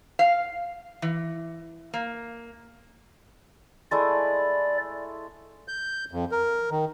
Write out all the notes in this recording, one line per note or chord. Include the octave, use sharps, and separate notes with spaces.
F5
E3
A#3
G#3 A3 E4 D5
G6
F2
A#4
D#3